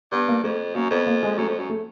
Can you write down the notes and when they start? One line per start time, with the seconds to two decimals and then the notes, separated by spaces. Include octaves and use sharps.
0.12 G2 B3
0.29 A#3
0.43 F2 A3
0.75 F#2 A#3
0.90 F2 B3
1.07 A#3
1.23 G#3
1.38 F#2 A3
1.48 F2
1.59 F#2
1.69 A3